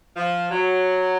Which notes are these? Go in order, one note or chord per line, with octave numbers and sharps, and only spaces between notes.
F3
F#3